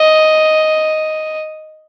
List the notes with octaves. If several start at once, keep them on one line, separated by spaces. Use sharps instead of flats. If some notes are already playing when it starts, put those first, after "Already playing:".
Already playing: D#5